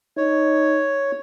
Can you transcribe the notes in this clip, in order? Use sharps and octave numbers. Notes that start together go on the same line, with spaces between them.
D#4 C#5